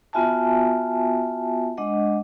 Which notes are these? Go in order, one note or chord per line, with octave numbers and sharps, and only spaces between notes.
B3 F4 F#4 E5 G#5 A5
G#3 D4 D#5 F#5